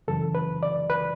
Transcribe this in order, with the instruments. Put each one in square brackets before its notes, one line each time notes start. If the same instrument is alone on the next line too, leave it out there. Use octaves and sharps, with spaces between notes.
[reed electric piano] F#2 C#3 E3 A4
B4
D5
B4